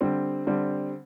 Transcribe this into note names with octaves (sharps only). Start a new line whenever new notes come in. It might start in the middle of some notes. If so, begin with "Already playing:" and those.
D3 G3 C4
D3 G3 C4